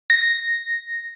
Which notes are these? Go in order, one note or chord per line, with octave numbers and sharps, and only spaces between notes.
A#6